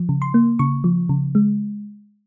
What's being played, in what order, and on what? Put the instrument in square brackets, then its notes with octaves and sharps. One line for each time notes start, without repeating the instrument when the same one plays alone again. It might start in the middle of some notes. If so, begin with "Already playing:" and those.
Already playing: [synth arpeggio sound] F3
C#3
C6
A#3
C#3 C#6
F3
C#3
G#3